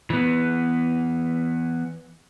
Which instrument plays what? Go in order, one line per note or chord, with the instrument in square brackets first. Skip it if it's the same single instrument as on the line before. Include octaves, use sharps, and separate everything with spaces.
[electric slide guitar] E3 B3